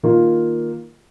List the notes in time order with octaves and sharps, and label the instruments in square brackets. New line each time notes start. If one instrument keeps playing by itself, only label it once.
[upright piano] D#3 A#3 F4